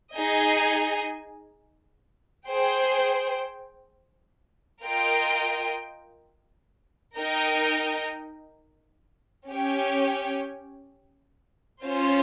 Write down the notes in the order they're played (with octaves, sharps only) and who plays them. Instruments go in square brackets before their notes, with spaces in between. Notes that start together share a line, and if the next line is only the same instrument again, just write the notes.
[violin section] D#4 G#4 D#5 G#5
G#4 C5 G5
F4 A#4 D#5 G5
D#4 A#4 D#5 G5
C#4 G4 C#5 G5
C#4 F4 C5